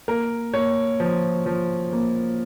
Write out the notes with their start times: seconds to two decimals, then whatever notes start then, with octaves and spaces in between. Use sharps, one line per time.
0.08 A#3 A#4
0.53 A#3 C#5
1.00 F3
1.46 F3
1.93 A#3